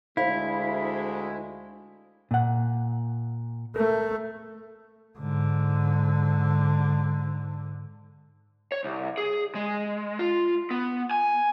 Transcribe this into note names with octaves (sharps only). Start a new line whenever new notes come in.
D2 G#3 E4 C5 F5
A#2 F#5
A3 A#4
G#2 D3
C#5
C2
G#4
G#3
F4
B3
G#5